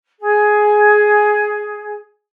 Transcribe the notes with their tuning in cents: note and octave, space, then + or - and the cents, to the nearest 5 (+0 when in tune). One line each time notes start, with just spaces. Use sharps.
G#4 +10